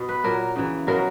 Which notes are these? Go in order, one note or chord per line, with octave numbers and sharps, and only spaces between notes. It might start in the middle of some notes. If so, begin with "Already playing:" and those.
Already playing: B2
B4
A#2 F#3 A#4
C#3 E3
B2 F#3 A#4